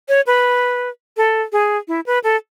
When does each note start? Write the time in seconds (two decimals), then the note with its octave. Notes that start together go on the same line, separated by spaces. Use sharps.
0.09 C#5
0.27 B4
1.17 A4
1.52 G#4
1.88 E4
2.06 B4
2.24 A4